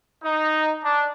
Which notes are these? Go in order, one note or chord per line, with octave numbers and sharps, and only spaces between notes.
D#4
D4